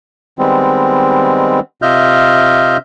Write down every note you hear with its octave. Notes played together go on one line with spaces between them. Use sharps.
D#3 G3 G#3 B3 C4
C3 F4 D#5 E5 F6 G6